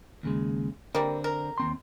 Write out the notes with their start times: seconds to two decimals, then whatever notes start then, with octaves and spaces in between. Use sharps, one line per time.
0.23 D#2 C#3 G#3
0.95 D3 G3 A#3 C4
1.24 A#4
1.58 D#2 C4 C6